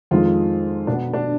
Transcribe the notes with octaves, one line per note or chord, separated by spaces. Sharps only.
F2 D#3 G#3 F4
B2 B3 D4
D4